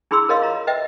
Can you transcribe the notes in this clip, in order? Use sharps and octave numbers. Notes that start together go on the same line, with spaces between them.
D4 E4 G#4 B5 C6 E6
A#4 C#5 D#5 F5 C6
F4 A#5
B4 D#5 E5 G5